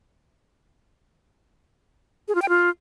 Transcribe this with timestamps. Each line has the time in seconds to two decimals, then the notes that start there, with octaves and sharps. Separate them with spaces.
2.28 G#4
2.35 F4
2.42 G5
2.49 F4